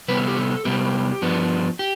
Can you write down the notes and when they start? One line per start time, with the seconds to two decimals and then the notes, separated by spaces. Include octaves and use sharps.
0.08 C3 G3 B3 B4
0.18 A4
0.28 G4
0.36 A4
0.65 C3 G3 B3 G4
1.22 G2 F3 B3 D4
1.79 G4